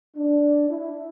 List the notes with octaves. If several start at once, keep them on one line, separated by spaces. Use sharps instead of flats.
D4
E4